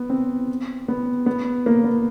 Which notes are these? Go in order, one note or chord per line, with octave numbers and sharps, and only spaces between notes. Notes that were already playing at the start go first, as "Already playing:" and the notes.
Already playing: B3
C4
B3
B3
A#3
B3